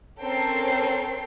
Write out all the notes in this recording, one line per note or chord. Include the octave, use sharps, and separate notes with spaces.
C4 C#4 A4 A#4 G5 C7